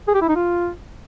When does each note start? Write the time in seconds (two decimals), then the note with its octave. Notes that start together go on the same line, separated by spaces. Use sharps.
0.08 G#4
0.15 G4
0.22 E4
0.29 D#4
0.35 F4